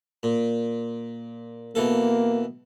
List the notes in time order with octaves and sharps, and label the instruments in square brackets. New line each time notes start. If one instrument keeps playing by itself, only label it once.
[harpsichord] A#2
[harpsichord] B2 E3 A4 [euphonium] A#3